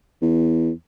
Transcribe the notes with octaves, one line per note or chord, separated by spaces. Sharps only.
E2